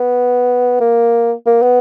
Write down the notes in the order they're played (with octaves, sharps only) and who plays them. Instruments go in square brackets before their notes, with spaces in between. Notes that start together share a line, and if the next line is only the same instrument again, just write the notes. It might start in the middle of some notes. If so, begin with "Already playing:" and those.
Already playing: [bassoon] B3
A#3
A#3
B3